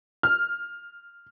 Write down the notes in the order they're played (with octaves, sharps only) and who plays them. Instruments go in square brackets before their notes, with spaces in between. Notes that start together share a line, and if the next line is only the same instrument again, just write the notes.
[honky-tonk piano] F6